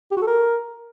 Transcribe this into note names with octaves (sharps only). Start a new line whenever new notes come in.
G4
F#4
A4
A#4